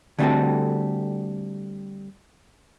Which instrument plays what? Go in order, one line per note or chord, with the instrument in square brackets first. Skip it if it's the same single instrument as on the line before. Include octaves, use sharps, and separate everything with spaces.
[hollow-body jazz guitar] D3 G3 A3 C4 F#4 A4